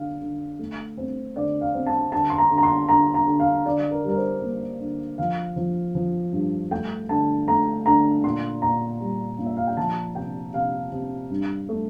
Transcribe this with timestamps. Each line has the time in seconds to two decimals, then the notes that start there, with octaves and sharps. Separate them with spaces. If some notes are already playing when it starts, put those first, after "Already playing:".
Already playing: D3 D4 F5
0.21 D3
0.59 A3
0.98 C4
1.36 D3 D5
1.61 F5
1.74 C4
1.86 A5
2.12 D3 A5
2.30 C6
2.38 A#5
2.51 D3
2.58 A#5
2.63 C6
2.89 D3 A#5
3.14 A#5
3.27 D3
3.40 F5
3.65 D3 D5
3.91 A#4
4.04 G3 A#4
4.17 C5
4.42 A#3
4.80 D3
5.18 F3 F5
5.56 F3
5.95 F3
6.33 G2
6.71 A3 G5
7.09 D3 A5
7.47 A3 A#5
7.86 D3 A#5
8.24 A#2 C6
8.62 A#2 A#5
9.00 G3
9.39 A#2
9.46 E5
9.57 F5
9.67 G5
9.77 F3 A5
10.15 C3 G5
10.53 C3 F5
10.92 C3
11.30 G2
11.69 A3